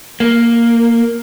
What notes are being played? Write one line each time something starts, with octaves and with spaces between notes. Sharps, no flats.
A#3